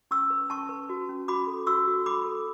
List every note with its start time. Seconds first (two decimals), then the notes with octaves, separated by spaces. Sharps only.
0.11 C#4 C#6 E6
0.30 B4
0.50 C#4 A5 C#6
0.69 B4
0.89 F#4
1.09 C#4
1.28 F#4 B5 D6
1.47 A4
1.67 F#4 C#6 E6
1.87 F#4
2.06 A4 B5 D6
2.25 A4